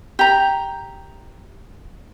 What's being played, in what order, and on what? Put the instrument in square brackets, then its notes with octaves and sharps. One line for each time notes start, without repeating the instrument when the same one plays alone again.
[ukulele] G4 A#5